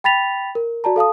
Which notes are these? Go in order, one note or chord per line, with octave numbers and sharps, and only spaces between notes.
G5 B5 A6 B6 F7
A#4
F#4 D5 A5 A#5
A4 F5 A5 D#6